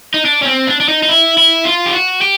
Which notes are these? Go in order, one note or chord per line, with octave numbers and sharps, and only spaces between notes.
D#4
D4
C#4
C4
D4
D4
D#4
D#4
E4
E4
F4
G4
F#4
G4